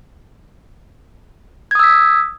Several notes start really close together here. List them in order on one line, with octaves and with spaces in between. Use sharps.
G#6 D#6 E6 B6